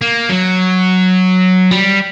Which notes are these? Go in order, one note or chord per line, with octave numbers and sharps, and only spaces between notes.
A#3
F#3
G3